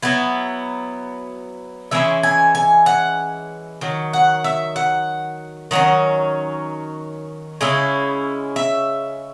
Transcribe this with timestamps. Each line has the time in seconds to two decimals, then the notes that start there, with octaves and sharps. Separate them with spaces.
0.03 F#3 B3 E4
1.91 E3 G#3 C#4 E4 E5
2.23 G#5
2.55 G#5
2.86 F#5
3.81 D#3 F#3
4.13 F#5
4.44 E5
4.76 F#5
5.71 D#3 F#3 A3 C#4
7.61 C#3 G#3 C#4 E4
8.56 E5